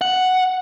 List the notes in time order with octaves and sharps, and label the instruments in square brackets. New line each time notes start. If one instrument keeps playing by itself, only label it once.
[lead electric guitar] F#5